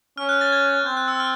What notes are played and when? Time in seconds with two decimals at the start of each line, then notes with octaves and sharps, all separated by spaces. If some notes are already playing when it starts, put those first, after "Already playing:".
0.18 C#4 F6
0.29 F#6
0.41 A6
0.52 G#6
0.86 C4 G6
0.97 F#6
1.08 E6
1.20 F6